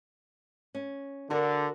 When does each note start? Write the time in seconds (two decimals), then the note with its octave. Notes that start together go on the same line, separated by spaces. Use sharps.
0.75 C#4
1.30 D3 F#4 A4 A#4